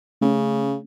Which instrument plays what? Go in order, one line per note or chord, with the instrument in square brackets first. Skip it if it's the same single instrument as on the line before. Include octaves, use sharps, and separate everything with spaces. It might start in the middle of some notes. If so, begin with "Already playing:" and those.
[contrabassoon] C#3 [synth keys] A3 C#4